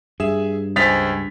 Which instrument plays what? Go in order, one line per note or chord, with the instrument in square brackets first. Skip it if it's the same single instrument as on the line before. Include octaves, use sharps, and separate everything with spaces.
[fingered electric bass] G2 [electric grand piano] G#4 E5 E7
[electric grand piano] C#2 C5 G#5 [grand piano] A6 B6 F7